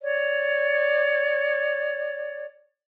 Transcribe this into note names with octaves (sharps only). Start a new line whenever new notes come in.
C#5 D5